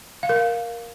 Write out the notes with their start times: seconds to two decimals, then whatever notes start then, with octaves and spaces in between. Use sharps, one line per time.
0.23 F5
0.29 A#4
0.36 F5